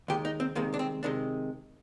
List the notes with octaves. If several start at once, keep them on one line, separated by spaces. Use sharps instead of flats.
D#2 D#3 G#3 G4
D#4
C4
C2 C3 D#3 G#3 A#3
D4
C4
C3 D#3 G#3 D4